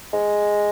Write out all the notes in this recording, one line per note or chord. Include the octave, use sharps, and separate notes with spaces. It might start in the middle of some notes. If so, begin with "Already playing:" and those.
G#3